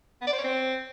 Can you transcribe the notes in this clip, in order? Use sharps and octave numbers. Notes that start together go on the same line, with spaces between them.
B3
D5
C5
C#5
C4